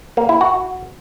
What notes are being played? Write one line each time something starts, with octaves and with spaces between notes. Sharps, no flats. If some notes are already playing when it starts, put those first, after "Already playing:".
A#3
E4
F#4